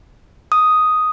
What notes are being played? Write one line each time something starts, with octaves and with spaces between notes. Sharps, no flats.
D#6